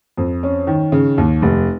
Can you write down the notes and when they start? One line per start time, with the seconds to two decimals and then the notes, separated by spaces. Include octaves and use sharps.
0.17 F2
0.43 C#4
0.67 D#3
0.92 C#3
1.18 D#2
1.42 F1